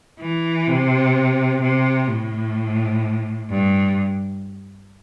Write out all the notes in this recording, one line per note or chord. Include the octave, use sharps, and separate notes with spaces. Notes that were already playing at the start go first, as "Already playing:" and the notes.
E3
C3
C3
A2
G2